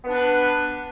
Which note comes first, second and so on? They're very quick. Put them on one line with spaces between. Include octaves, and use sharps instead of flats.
B3 D4 B4